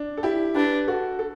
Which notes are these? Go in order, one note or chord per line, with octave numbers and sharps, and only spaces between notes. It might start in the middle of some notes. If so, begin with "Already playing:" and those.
Already playing: D4
A4
E4 G4
D4 G4 B4
F#4 A4
A4